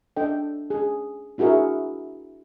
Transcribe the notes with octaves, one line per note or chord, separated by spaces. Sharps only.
D4 A4 D#5 G5
G#4
D4 E4 F#4 G#4 A#4 E5